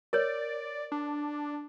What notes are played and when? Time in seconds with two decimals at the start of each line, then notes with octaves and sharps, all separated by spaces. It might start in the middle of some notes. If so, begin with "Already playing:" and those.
0.13 A#4 C#5 D5
0.92 D4